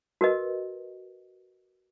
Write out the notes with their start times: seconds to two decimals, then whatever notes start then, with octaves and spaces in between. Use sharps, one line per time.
0.21 F#4 A#4 B4 D#5